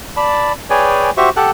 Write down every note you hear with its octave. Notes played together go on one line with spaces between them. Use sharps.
D5 A5 B5
G#4 B4 C#5 D5 G5 G#5
F#4 G4 C5 E5 C#6
G4 A4 F#5 G5 A5 F#6